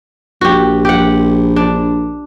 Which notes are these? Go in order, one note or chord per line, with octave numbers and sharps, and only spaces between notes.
A#1 F#4 G4
G4 F#5
D4